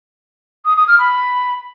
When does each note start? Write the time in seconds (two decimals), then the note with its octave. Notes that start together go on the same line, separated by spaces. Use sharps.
0.65 D#6
0.76 D#6
0.88 F6
0.99 B5